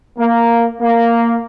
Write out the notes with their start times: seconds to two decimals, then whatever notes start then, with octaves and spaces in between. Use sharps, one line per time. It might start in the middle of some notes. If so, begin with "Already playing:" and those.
0.18 A#3
0.81 A#3